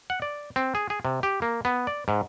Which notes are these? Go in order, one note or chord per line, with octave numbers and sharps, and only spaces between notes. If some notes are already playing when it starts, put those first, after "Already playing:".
F#5
D5
C4
G#4
G#4
C3
G4
A#3
B3
D5
G#2